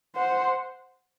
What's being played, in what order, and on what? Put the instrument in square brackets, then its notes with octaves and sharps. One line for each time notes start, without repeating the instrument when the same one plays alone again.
[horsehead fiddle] C5 [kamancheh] F#5